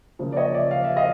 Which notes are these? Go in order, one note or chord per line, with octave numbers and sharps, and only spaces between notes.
C#3 F3 A#3
D5
C#5 D#5
D5 E5
F5
E5
D#5 F5